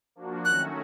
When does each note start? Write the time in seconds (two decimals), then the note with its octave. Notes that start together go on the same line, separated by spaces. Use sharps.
0.15 F3 A#3 D4 F#4
0.45 D#3 F#3 A3 C#4 F#4 F#6